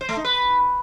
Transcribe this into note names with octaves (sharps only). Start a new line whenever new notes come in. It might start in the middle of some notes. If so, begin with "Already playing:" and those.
C5
A3
D#4
B4